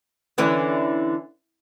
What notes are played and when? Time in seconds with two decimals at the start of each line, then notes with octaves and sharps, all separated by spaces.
0.38 D3 E3 C#4